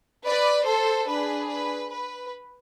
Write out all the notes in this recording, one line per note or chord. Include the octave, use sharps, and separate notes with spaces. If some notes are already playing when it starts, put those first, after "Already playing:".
B4 D5
A4 C5
D4 G#4 B4
B4
B4